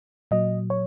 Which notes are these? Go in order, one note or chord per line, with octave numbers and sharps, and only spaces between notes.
A#2 F#3 D#5
C#5